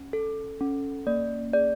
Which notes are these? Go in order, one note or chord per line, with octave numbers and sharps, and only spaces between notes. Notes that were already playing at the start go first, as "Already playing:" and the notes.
Already playing: C#4
A4
C#4
A#3 D5
G#4 D5